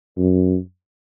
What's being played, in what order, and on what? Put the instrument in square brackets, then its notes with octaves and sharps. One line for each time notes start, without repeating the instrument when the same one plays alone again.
[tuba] F#2